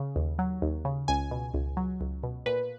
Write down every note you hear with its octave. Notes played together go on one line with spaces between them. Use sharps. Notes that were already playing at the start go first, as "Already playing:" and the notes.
Already playing: C#3
D#2
F#3
D#2
C#3
C#2 G#5
B2
C#2
F#3
C#2
B2
A#2 B4